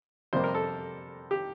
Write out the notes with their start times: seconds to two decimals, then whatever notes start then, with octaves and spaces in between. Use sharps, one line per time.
0.33 F2 C3 G3 A#3 C5
0.44 A#4
0.55 A4
1.31 G4